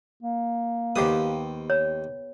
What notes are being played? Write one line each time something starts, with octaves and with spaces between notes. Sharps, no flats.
A#3
D#2 B3 G4 C5 D#6
C#5